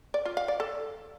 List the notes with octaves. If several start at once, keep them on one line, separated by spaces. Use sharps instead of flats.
D5
F4
F5
D5
A4